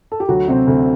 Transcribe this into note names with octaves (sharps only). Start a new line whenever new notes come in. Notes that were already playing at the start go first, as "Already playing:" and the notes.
A4
G4
D2 F#3 F#4
C3 F#3 C4
D2